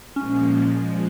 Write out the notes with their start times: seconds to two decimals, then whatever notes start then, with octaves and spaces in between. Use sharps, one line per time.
0.16 A#2 F3 G#3 C#4
0.78 F3 G#3